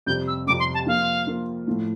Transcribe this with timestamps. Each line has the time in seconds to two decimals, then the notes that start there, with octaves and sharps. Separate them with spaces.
0.06 F2 C3 G3 C4 G6
0.27 E6
0.47 F2 C3 G3 C4 D6
0.59 C6
0.74 A5
0.86 F3 A#3 F4 F5
1.27 F3 A#3 F4
1.67 A2 F3 A3